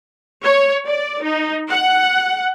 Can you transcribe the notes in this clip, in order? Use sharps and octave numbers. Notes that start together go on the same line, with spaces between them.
C#5
D5
D#4
F#5